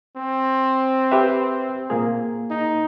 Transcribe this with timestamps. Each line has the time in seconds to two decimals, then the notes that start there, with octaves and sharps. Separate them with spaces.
0.17 C4
1.11 G4 B4 E5
1.90 A#2 A#3 G#4
2.51 D#4